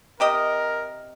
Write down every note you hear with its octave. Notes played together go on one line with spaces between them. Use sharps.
C3 G4 A#4 D#5